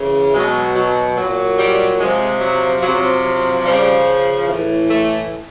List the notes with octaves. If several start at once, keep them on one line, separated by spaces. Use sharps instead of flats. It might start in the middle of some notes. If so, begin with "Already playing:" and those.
Already playing: C#3 E3
B2 F#3 G#3
F#3
A#2 F#3
G3
C3 F3 G#3
F#3
C3 F3 F#3
F#3
C#3 F3 G3
A2 E3
A3